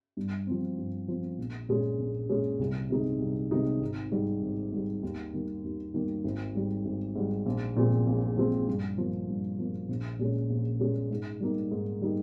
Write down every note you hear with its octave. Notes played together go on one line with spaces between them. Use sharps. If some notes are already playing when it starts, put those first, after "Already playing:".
G2
F3 C4
G2
F3 C4
A#1
A#2 G#3 C#4
A#1
A#2 G#3 C#4
C2
C3 D#3 G#3 D#4
C2
C3 D#3 G#3 D#4
G#1
G#2 G3
G#1
G#2 G3
D#2
D#3 G3 A#3
D#2
D#3 G3 A#3
G#1
G#2 G3
G#1
G#2 G3
A#1
A#2 F3 G#3 C4
A#1
A#2 F3 G#3 C4
G2
F3 A#3
G2
F3 A#3
A#1
A#2 G#3 C#4
A#1
A#2 G#3 C#4
G#2
G3 A#3 D#4
G#2
G3 A#3 D#4